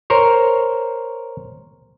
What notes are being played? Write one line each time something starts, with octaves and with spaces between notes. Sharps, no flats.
A#4 C5 C#5